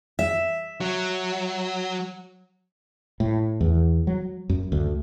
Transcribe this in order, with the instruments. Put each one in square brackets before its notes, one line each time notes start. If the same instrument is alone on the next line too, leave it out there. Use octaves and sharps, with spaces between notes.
[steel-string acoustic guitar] E5
[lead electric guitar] F#3
[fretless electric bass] A2
E2
F#3
F#2
D2